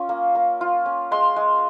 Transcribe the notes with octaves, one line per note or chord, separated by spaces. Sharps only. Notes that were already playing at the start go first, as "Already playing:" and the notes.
Already playing: C#4 F4
A#3
A#3
F4
C#4
G#3 C6
G#3